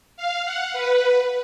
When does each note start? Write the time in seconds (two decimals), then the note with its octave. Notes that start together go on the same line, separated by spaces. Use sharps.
0.17 F5
0.45 F#5
0.73 B4